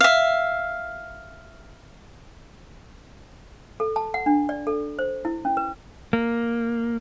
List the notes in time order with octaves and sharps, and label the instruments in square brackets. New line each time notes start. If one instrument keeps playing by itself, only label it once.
[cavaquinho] E5 F5
[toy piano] A4
A5
F#5
D4
D5
A4
C5
E4
C#4
B4
[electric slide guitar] A#3